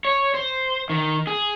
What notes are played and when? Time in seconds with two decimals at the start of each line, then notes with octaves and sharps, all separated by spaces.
0.05 C#5
0.34 C5
0.90 D#3
1.27 G#4